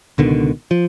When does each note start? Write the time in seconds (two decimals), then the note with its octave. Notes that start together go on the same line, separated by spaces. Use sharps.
0.18 C#2 B2 D3 D#3
0.71 F3